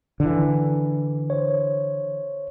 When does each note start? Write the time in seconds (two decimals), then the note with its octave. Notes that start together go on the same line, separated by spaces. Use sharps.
0.20 D3 E3
1.30 C5 C#5